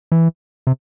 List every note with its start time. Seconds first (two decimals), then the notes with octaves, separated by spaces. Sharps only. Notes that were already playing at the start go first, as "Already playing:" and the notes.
0.12 E3
0.67 C3